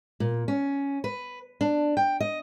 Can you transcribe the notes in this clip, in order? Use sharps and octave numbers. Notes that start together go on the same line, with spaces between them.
A#2
C#4
B4
D4
G5
D#5